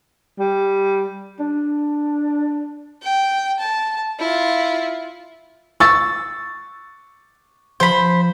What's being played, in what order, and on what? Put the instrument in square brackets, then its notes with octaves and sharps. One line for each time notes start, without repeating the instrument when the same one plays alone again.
[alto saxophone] G3
D4
[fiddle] G5
A5
E4 F4
[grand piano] C#6 A6 [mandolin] E6
[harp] F3 [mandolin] C5 B5